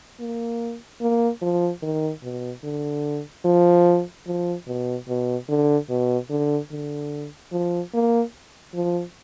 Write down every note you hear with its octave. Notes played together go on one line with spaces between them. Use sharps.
A#3
A#3
F3
D#3
B2
D3
F3
F3
B2
B2
D3
B2
D3
D3
F3
A#3
F3